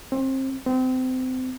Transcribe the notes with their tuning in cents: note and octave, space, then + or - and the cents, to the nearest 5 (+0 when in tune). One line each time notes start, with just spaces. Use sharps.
C4 +25
C4 -30